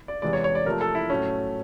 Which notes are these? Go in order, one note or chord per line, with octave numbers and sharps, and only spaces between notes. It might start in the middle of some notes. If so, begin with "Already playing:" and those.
D5
E2 C3 E3 G#3 D5
C#5
C#5
D5
C3 F3 A3 A#4
A4
E4
A2 F#3 A3 C#4